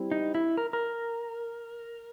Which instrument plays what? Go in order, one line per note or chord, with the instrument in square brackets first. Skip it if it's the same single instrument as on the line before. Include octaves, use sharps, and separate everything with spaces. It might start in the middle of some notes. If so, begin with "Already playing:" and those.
Already playing: [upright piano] G3 C4 E4
[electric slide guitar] D#4
E4
A#4
A#4